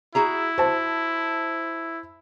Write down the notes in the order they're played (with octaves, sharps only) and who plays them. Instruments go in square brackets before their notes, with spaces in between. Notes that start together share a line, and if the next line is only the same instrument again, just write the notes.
[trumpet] E4 [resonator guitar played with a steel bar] F#4 G#4 A#5
[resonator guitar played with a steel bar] F#4 [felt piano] C5 A5